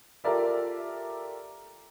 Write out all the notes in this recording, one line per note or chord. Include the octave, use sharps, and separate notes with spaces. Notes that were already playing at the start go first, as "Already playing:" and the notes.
F4 G4 A4 A#4 D5 E5